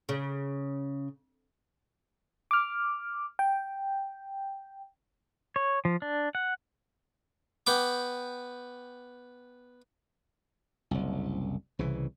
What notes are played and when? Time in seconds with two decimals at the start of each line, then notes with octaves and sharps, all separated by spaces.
0.09 C#3
2.51 D6 F6
3.39 G5
5.56 C#5
5.85 F3
6.02 D4
6.35 F#5
7.67 B3 G5 D6
10.91 F#1 C2
11.79 C2 C#3 E3